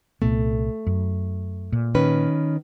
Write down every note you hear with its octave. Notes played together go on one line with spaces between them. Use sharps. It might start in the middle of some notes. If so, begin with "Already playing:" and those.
C2 A#2 A3 B3
F#2
A#2
D#3 C#4 B4